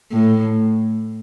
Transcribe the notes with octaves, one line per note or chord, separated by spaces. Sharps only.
A2